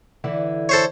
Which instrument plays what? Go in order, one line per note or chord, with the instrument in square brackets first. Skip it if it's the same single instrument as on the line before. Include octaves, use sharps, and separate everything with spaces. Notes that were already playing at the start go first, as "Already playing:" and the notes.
[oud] D3 E3 E4
[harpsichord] A4 C5 C#5